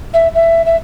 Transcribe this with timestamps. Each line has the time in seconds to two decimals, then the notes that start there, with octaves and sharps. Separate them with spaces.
0.13 E5
0.35 E5
0.66 E5